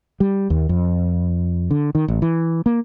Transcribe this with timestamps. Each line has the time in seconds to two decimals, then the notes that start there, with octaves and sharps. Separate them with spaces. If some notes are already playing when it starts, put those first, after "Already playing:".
0.20 G3
0.50 D#2
0.69 F2
1.71 D3
1.95 D#3
2.08 A1
2.22 E3
2.66 A#3